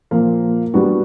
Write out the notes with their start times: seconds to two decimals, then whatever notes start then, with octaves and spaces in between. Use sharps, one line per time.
0.11 A#2 F3 A#3
0.74 G3 B3 D4 F#4